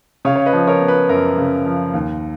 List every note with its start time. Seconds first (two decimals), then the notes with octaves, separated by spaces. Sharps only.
0.25 C#3 C#5 F5
0.36 C#5
0.46 B4 D#5
0.53 F3
0.67 A#4 C#5
0.81 B3
0.88 B4
1.09 F#2 A#4
1.38 C#3
1.66 F3
1.94 D#2